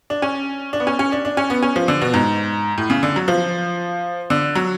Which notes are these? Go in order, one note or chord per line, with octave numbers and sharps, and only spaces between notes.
D4
C#4
D4
B3
C#4
C#4
D4
D4
C#4
B3
C#4
F3
D3
B2
G#2
A2
C#3
D3
F#3
F3
D3
F#3